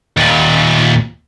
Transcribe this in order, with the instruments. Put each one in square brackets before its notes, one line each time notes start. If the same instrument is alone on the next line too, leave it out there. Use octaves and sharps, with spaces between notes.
[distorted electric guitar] D#2 A#2